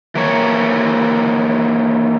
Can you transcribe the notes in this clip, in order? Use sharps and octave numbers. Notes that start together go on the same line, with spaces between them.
E3 A#3 C#5